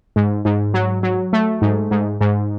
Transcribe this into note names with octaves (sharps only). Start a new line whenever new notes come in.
G#2
G#2
F#3
F#3
A3
G#2
G#2
G#2